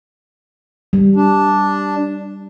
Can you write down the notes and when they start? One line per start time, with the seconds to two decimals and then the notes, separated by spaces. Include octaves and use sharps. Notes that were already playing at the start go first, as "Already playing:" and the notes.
0.93 G3
1.16 D4